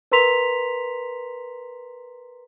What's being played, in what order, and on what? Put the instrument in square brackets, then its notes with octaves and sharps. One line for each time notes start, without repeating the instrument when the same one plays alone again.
[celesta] A#4 B4 A#5 C6 B6 F7